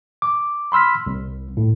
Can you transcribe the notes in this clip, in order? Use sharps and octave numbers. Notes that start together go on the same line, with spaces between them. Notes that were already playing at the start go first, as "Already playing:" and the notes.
D6
B5 C6 E6 F6 B6
C2
A2